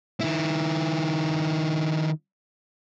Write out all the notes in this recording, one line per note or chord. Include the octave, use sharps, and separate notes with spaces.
D#3 E4